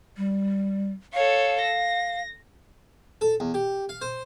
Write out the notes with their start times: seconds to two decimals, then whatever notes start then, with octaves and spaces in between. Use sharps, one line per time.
0.17 G3
1.14 A4 C#5 F5
1.61 A#6
3.21 A4
3.40 E2
3.54 G4
3.89 F5
4.01 C5